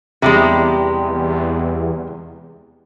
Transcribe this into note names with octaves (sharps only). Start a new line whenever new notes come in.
E2 C3 G3 G#3